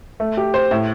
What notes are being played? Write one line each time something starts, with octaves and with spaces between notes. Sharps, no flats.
A3
G4
C5
A2